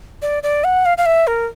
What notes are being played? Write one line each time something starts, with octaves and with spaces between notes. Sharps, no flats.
D5
D5
F#5
F5
F5
E5
A#4